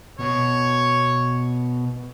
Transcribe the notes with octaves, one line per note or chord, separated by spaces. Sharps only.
B2 C#5